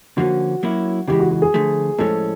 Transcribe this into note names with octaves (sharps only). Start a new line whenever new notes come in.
D3 F3 A#3 C#4 F#4
F#3 A#3 C#4 E4
C#3 E3 G#3 G4
F#4
F#4
G#4
D3 F3 A3
A2 F3 G#3 C#4 A4